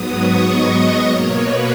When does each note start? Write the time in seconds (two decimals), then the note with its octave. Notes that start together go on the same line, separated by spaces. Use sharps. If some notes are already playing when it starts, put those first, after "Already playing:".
Already playing: G#2 F#3 B3 D#6
0.17 C#6
0.46 D#5
1.05 B2 A#3 C#5
1.35 B4